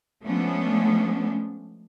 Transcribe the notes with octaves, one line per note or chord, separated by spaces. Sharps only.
F3 G#3 A3 B3 C#4 D4